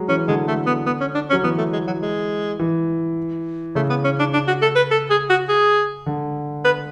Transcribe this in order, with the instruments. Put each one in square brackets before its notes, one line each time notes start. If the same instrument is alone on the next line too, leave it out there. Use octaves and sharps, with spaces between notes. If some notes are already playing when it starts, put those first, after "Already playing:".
Already playing: [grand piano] F#3 G#3
[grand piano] E3 [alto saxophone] C#4
[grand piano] D3 [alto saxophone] G#3
[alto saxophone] A3
B3
B3
C#4
D4
C#4
[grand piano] F#3
[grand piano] E3 [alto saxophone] B3
[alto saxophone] A3
G#3
F#3
G#3
[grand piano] E3
[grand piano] C#3 [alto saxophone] A3
[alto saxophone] B3
C#4
D4
D4
F#4
A4
B4
A4
G#4
F#4
G#4
[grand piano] D3
[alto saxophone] B4